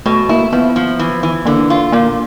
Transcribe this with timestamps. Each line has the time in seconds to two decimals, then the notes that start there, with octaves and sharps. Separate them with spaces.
0.06 B2 A3
0.29 A#3 E4
0.53 F3 B3
0.76 F3
0.99 E3
1.23 E3
1.46 D3 A#3
1.70 F4
1.92 A#2 A#3